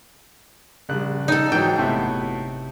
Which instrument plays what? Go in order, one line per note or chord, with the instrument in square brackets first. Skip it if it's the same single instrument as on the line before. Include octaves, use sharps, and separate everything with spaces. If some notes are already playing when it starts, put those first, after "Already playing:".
[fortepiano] A#1 F#6 [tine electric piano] C#3 G3
[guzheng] D#4 A4
[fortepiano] G#2 F#3 [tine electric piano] E3 [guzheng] G5
[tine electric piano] G1 C3 E5 [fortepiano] A2 B3